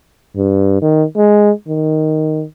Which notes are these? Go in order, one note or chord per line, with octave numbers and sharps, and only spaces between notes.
G2
D#3
G#3
D#3